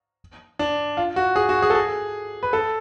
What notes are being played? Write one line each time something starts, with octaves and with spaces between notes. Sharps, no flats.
D4
F4
F#4
G#4
F#4
G#4
A4
G#4
B4
A4